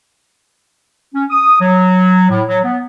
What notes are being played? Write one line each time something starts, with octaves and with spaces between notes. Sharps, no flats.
C#4
D#6
F#3
A2
F#3
B3